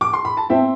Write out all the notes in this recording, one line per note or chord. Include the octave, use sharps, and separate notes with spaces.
D6
C6
B5
A5
C4 E5 G5